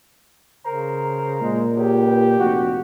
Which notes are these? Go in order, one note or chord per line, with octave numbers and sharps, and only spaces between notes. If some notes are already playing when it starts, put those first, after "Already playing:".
C#3 A#4 C5 A#5
A#2 G#3
C#2 G4
F1 F#4